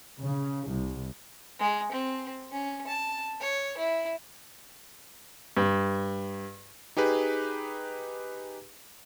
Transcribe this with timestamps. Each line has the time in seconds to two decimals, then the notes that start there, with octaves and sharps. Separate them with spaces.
0.20 C#3
0.67 C2
1.59 G#3
1.92 C4
2.51 C#4
2.87 A5
3.40 C#5
3.78 E4
5.57 G2
6.97 D#4 G4 G#4 B4